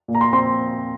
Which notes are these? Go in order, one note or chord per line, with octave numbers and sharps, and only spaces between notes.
A#2
A#5
C6
C4 C6